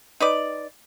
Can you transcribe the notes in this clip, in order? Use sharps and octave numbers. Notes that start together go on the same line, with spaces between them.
D#4 B4 D5